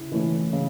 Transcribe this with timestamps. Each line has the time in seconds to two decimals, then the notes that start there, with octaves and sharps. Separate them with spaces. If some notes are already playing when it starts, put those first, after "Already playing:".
Already playing: C#3 E4
0.12 E3 A3 C#4
0.53 C#3